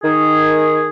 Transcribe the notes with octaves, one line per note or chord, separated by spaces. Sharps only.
D#3 G#4